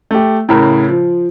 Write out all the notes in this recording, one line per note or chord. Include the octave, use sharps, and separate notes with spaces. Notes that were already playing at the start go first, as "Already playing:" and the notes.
A3 G4
A2 C#3 A#4
F3